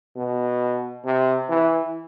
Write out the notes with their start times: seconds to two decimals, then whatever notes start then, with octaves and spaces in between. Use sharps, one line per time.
0.16 B2
1.05 C3
1.49 E3